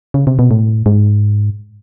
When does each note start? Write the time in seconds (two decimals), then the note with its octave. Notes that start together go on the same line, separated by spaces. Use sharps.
0.14 C#3
0.27 C3
0.39 B2
0.51 A2
0.86 G#2